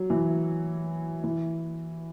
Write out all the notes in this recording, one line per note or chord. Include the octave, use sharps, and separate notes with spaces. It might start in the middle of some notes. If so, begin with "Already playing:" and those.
Already playing: F#3
E3
E3